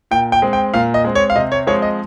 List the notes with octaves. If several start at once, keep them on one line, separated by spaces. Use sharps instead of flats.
A#2 G5
G5
G#3 C4
G5
A#2 F5
D#5
G#3 C4
C#5
F5
C3 D#5
C#5
F3 G#3 C4 C#5
D#5